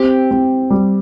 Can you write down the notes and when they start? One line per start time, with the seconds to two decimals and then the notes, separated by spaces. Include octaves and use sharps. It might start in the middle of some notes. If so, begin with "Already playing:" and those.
Already playing: C4 G4
0.31 C4
0.70 G3